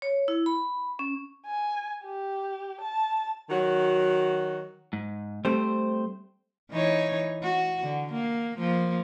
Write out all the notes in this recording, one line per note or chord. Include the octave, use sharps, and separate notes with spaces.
C#5
E4
B5
C#4
G#5
G4
A5
D#3 F#3 F#4
G#2
G3 A3 C4 C5
E3 D#4 C#5
F#4
D3
A#3
F3 A#3